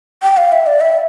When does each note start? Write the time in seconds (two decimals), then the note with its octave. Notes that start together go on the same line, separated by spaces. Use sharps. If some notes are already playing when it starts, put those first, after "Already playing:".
0.23 G5
0.37 F5
0.52 E5
0.67 D5
0.81 E5